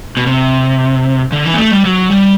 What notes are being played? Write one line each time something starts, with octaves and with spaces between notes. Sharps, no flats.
B2
C3
D3
E3
B3
A3
G3
F#3
G3